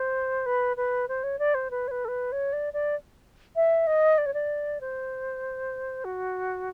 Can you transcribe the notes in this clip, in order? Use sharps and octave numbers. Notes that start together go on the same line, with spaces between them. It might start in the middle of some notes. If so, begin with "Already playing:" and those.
Already playing: C5
B4
B4
C5
C#5
D5
C5
B4
C#5
B4
A4
B4
C#5
D5
D5
E5
D#5
D5
C#5
D5
C5
F#4